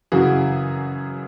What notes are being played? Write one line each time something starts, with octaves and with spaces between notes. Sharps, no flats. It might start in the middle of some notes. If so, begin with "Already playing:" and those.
F#2 C#3 E3 F#4 G#4